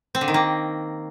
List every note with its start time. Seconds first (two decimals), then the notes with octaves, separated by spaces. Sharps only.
0.15 C4
0.21 D3
0.28 D#3
0.34 A#3